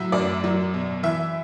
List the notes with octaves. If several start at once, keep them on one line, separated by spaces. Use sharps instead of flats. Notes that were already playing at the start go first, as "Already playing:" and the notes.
Already playing: A2 F#3 E5
F#2 D5
F#3
B2
E3 E5